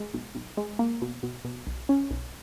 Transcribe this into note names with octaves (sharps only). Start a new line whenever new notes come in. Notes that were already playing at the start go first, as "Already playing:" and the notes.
Already playing: G#3
B1
B1
G#3
A#3
B2
B2
B2
B1
C#4
B1